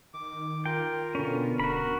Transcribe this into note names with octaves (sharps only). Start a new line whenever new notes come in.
D#3 D6
F4 A#4 G5
B2 D3 B3 C#4
D1 F#4 A#4 B5